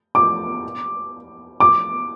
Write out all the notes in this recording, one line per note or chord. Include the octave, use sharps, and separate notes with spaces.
D6
D6